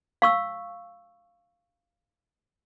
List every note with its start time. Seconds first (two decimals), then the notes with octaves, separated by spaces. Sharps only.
0.22 F5 C#6 E6